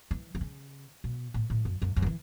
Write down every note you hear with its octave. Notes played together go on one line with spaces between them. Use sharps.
E3
E3
C#3
B2
A2
A2
F#2
F#2
F#2
F#3
E3